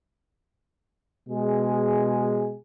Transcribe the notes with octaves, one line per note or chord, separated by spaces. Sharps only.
B2 G#3 G#4